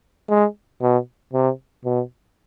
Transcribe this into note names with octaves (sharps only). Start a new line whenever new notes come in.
G#3
B2
C3
B2